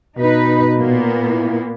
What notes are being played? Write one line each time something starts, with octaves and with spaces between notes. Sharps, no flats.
B2 D#4 B4
A#2 A#3 B3
E4